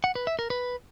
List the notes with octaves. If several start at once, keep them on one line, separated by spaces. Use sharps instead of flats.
F#5
B4
E5
A#4
B4